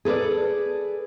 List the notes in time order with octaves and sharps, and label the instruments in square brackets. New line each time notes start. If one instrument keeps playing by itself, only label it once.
[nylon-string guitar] G#4 A4 B4 D5